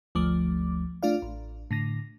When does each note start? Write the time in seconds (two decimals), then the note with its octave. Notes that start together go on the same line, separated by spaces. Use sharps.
0.15 G1 D2 F3 A3 D6
1.03 A3 D4 F4 D5 F5
1.22 A1
1.71 A2 D3 A#6